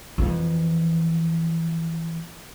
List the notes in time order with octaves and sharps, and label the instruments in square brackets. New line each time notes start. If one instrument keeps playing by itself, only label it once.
[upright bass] F2 E3